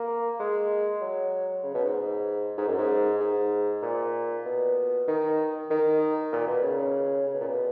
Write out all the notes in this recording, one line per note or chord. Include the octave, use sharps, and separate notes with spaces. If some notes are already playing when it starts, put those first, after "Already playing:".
Already playing: A#3
G#3
F#3
C#3
B2
G#2
G#2
F#2
G#2
G#2
A#2
B2
D#3
D#3
A#2
B2
C#3
C#3
B2
A#2
B2